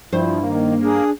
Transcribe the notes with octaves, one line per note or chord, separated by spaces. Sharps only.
G2 F3 E4 C5
D#3 A#3
D4 G#4